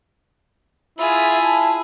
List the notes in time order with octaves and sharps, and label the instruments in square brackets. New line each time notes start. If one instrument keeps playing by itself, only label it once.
[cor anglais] E4 [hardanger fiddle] F4 G#4 [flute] E5
[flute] A5